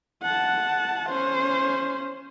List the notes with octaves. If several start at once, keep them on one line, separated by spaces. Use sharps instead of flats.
F#5 A5
C#4 C5